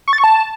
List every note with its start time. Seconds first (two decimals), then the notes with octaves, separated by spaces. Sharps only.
0.08 C#6
0.13 A6
0.18 C#6
0.24 A5